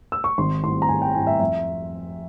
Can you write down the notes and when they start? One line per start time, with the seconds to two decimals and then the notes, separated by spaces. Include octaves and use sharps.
0.12 E6
0.24 C#6
0.38 G#1 C6
0.63 G#2 G3 C4 E4 C6
0.82 A#5
0.89 G#1 G#5
1.02 G5
1.15 G#2 G3 C4 E4 G#5
1.27 E5
1.40 F2 E5